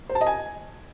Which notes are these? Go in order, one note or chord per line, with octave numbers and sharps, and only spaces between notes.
C5
A5
D#5
G#5